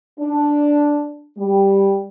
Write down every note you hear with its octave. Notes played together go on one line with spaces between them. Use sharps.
D4
G3